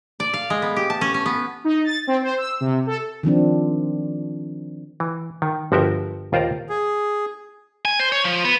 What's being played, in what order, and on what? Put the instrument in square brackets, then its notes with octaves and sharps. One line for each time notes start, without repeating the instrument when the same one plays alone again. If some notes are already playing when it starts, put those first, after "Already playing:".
[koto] D5
F5
G#3
B3
G4
A5
C#4
C#4
B3
[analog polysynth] D#4
A6
C4
C5
E6
C3
A4
[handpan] D#3 F3 C4 D4
[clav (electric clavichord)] E3
D#3
G1 F3 F#4 A#4 E5 G5
D#2 F4 C5 D5 A#5
[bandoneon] G#4
[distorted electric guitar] G#5
C5
C#5
F3
B3